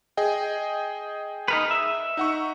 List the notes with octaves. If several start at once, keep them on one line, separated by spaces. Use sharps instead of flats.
G#4 D#5 G5
D#4 A#4 B4
E5
D#4 F#5 C#6